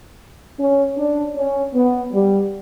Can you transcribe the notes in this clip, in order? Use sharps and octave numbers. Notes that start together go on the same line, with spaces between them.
C#4
D4
C#4
B3
G3